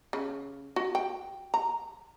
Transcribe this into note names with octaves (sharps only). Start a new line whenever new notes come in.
C#3
F#4
G5
A#5